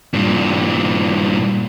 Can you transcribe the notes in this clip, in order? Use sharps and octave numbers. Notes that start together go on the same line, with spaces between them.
G2 A#2